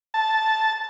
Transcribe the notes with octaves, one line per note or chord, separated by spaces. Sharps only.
A5